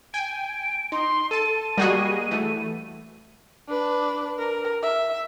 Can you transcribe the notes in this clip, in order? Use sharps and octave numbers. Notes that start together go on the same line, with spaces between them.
G5 G#5 D7
D#4 C6
A4 A5 D#7
G3 A#3 F#4 G#4 D#5
E3 A3
D4 B4
A#4
E5